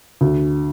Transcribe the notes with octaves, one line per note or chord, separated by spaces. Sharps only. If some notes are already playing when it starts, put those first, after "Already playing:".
D2